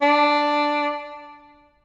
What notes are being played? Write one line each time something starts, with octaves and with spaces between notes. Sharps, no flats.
D4